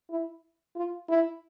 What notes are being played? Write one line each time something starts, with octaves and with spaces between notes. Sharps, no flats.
E4
F4
E4